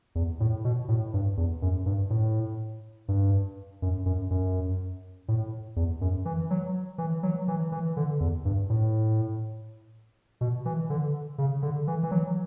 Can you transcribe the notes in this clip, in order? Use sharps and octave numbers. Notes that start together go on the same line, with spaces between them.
E2
A2
B2
A2
G2
E2
F#2
G2
A2
G2
F#2
F#2
F#2
A2
E2
F#2
E3
F#3
E3
F#3
E3
E3
D3
E2
G2
A2
B2
E3
D3
C#3
D3
E3
E3
F#3